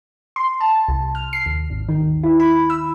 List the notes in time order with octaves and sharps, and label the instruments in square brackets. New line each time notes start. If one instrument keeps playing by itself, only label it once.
[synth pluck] C6
A5
C2
F6
C7
D#2
G#1
D#3
D#2
E4
B5
E6